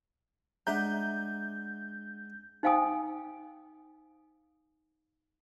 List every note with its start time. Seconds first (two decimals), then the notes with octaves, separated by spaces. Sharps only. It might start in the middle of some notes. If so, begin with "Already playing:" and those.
0.67 G#3 D4 E5 F#5 A#5 G6
2.63 D#4 C5 F5 G5 G#5 D#6